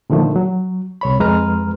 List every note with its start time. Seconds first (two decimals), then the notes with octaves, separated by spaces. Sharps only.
0.10 A#2 D3 D#3 F3 A3
0.36 F#3
1.01 C2 C#5 B5
1.20 F2 G#3 B4 A#5 F6